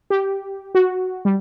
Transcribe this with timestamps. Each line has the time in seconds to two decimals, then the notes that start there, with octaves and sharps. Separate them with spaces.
0.10 G4
0.75 F#4
1.25 G3